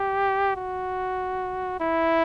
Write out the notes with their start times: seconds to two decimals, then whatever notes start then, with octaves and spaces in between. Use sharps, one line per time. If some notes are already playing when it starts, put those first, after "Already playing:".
Already playing: G4
0.56 F#4
1.80 E4